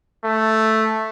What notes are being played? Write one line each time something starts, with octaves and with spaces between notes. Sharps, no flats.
A3